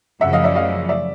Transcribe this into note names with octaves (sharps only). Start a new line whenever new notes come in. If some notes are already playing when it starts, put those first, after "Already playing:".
F#2 C#3 F3 E5 F#5
D#5 F5
D5 E5
D#5 F5
D5 E5